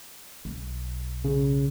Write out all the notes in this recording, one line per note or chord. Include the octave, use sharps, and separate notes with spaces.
B1
C#3